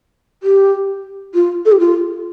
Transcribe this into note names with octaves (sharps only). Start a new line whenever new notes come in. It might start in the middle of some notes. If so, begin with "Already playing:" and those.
G4
F4
A4
G4
F4